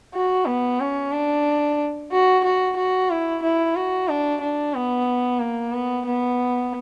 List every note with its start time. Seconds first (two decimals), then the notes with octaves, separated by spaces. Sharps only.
0.15 F#4
0.47 B3
0.80 C#4
1.12 D4
2.12 F#4
2.44 F#4
2.77 F#4
3.10 E4
3.43 E4
3.76 F#4
4.08 D4
4.41 D4
4.75 B3
5.40 A#3
5.73 B3
6.06 B3